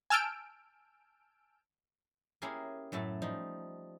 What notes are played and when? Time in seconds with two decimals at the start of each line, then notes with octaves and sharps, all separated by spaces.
0.10 G#5 A5 E6 F6 G6 D7
2.42 A#3 C#4 E4 G4 G#4 A#4
2.92 F#2 A2 A3 A5
3.22 F3 G3 D#4